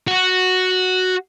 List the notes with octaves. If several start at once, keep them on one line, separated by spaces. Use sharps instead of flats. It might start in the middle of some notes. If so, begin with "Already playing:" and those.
F#4